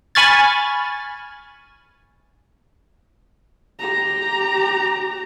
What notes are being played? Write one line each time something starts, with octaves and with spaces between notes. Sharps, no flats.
G#5 B5 C#6 F6 G#6 A6
G4 A#5